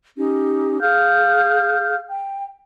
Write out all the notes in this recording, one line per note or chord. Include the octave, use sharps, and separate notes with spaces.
C#4 D#4 G4
G#4 F5 F6 G6
G5